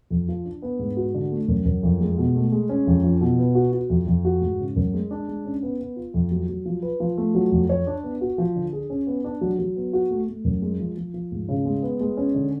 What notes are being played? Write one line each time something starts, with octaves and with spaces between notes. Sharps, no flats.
F2
F3
D4
B3
G#2
F#4
D3
A3
F#2
F#2
F2
G#3
B2
A3
G#3
C#4
F2
F3
B2
B3
F#4
F#4
F2
F2
F#4
G#2
C#3
F#2
G#3
D4
G#3
C#4
B3
B3
F4
F2
F#3
F#3
F3
B4
F3
A3
F#3
F2
C#5
D4
B3
F#4
F3
D3
G#4
C#4
B3
D4
F#3
F#3
B3
F#4
A3
A3
F#2
G#3
F3
F3
F3
G#2
C#3
G#3
B3
G#3
C#4
D3